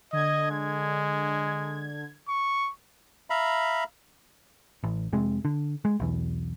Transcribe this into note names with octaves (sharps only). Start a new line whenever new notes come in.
D3 D#5 G#6
G#3
C#6
E5 F5 A#5 B5
A1
F1 C3 G#3
D3
G#3
B1 E2